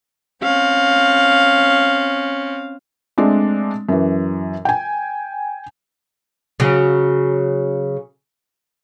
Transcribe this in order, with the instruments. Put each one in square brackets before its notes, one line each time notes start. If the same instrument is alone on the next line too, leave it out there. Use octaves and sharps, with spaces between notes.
[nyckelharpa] C4 C#4 [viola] F5
[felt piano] G#3 A3 C4 D4
F#2 E3
G5 G#5
[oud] C#3 F#3